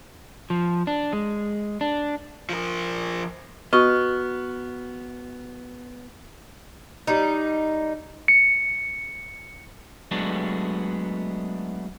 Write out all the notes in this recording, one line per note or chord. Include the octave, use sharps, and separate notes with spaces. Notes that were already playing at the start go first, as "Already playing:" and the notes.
F3
D4
G#3
D4
F3 A#4
B3 F#4 D#5 C#6 F6
G3 D#4
C#7
F#3 G#3 A3 B3 D4